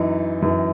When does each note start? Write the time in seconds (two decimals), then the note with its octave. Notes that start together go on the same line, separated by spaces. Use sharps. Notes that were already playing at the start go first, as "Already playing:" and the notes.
Already playing: F#2 E3 D#4
0.42 F#2 E3